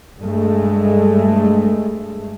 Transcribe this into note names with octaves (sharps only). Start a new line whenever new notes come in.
G2 G#3 A3